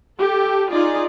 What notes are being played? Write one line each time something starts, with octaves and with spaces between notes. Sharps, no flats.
G4 A4
D#4 F4 G#4 D5